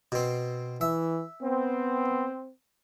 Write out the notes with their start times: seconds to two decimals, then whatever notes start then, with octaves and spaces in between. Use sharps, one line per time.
0.12 B2 C4
0.81 E3 E5
1.42 B3 C4